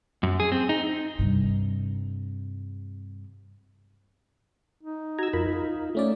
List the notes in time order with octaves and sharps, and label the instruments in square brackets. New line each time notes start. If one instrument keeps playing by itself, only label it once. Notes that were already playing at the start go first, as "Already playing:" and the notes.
[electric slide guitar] F#2
G#4
C4
D#4
[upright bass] G2 C3
[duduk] D#4
[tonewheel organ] F#4 G#6 [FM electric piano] A#5 E6
[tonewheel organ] F2 F4 A#4 [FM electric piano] B5
[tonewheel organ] F4
[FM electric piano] A3 C#4 D5